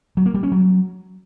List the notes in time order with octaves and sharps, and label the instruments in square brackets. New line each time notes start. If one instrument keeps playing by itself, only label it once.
[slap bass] F#3
A#3
G3
C#4
F#3